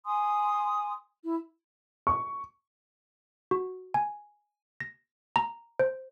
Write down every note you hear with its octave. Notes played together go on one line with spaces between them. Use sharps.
G#5 C6 D#6
E4
C#6
F#4
G#5
A#6
A#5
C5